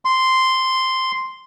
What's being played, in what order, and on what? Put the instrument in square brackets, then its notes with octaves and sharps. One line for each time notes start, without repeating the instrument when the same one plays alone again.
[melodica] C6